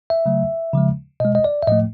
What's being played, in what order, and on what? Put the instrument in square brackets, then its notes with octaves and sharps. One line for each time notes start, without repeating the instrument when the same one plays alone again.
[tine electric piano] E5
C#3 F#3 A3
C#3 F3 G#3
B2 G#3 D#5
D#5
D5
E5
A2 F3 A3 D#5